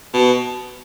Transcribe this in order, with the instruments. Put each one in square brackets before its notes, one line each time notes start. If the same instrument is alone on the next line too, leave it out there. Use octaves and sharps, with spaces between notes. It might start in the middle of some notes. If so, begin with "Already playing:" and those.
[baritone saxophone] B2